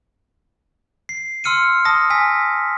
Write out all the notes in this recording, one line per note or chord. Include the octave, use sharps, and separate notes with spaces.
C7
C6 E6 F6 C#7 D#7
A5 D#6 A#6
G#5 E6 B6